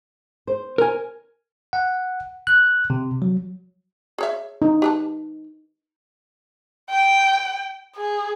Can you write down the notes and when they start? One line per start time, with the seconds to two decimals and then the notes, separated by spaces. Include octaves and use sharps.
0.47 C5
0.78 A#4 G#5
1.73 F#5
2.47 F#6
2.90 C3
3.22 F#3
4.18 G#4 C#5 E5
4.62 D#4
4.82 G4 B4 A5
6.90 G5
7.96 G#4